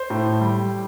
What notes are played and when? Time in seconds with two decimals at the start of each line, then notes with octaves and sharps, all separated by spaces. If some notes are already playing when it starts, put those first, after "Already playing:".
Already playing: C5
0.10 A2
0.41 G3